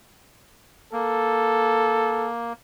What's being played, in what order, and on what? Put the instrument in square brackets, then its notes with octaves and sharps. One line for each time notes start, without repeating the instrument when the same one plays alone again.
[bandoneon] A#3 [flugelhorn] A4